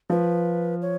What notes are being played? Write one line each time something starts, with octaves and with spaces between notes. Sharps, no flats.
F3 B4
C#5